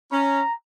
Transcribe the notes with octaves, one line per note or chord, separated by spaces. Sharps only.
C#4 A#5